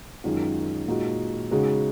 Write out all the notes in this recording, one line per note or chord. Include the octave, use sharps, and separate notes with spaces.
F#2 D#3 G#3 C#4 F4
A#2 G#3 D#4 F#4
C#3 G#3 D#4 F#4